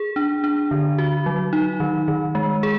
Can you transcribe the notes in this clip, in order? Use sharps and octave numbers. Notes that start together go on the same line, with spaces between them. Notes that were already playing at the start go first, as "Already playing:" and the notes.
Already playing: G#4
D4
D4
D3
F#4
F#3
D#4
D#3
D#3
G#3
G#4